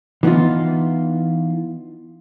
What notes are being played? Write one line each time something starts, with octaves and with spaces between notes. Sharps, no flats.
E3 B3 D#4 F4